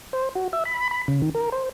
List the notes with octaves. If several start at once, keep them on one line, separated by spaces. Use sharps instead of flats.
C5
F#4
E5
B5
B5
C#3
D#3
A#4
C5